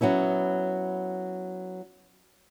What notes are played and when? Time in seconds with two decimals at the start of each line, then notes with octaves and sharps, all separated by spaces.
0.01 F#3 B3 C#4 E4